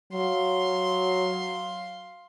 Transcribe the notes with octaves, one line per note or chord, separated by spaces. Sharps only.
F#3 F5 C6